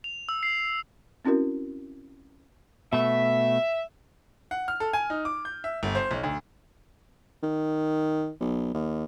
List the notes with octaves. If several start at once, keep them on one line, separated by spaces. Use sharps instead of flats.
F7
E6
C7
C4 C#4 E4 F#4 A#4
B2 A3 E5
F#5
F6
A4
G#5
D#4
D6
G6
E5
G1
C5
B1
D2
D#3
B1
D#2